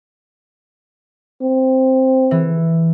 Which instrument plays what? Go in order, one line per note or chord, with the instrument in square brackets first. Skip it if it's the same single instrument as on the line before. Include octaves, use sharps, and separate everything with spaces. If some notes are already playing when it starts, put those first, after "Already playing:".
[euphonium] C4
[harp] E3